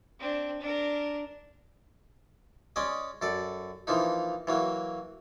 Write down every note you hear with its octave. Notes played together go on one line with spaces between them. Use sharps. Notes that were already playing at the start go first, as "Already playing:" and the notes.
C4 D4
D4 A#4
G#3 C#4 D5 D#5
F#2 A4 D5
E3 F3 A#3 D#4
E3 F#3 A#3